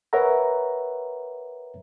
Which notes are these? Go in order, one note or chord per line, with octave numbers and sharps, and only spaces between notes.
A#4 B4 C#5 E5 F#5 A#5